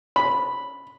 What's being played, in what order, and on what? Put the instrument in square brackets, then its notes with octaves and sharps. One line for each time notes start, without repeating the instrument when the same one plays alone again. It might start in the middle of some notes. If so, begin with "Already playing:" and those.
[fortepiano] B5